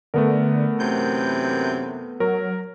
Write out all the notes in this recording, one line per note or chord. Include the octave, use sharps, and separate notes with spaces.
D3 A3 B3 A#4
F#2 C3 E3 G6
F#3 A#4